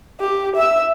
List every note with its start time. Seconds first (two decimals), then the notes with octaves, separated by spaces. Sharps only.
0.20 G4
0.56 E5 E6